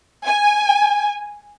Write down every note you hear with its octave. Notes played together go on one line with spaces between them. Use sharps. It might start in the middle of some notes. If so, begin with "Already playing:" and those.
G#5